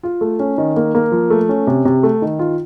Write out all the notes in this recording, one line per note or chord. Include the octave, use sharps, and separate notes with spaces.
F4
A3
C#4
D#3
A#3
A#3
F3
A3
C#4
C3
C3
A3
D#3
F4